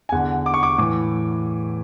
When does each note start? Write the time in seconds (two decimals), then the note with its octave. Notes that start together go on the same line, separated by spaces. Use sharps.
0.09 G#5
0.12 E2 D3 F#5
0.46 D6
0.54 C#6
0.63 D6
0.78 A2 E3 D6